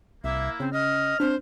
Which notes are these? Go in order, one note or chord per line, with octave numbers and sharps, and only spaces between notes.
C2 A#3 E4 E5
C#3 C4
D#5 F6
C4 D4 C5